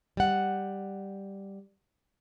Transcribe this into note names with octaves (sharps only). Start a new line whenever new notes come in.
G3 F#5